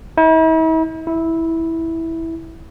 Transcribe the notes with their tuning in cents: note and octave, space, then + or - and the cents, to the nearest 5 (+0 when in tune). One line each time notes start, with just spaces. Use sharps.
E4 -45
E4 -10